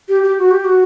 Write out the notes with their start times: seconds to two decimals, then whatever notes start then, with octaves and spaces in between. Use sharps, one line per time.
0.09 G4
0.23 G4
0.39 F#4
0.51 G4
0.65 F#4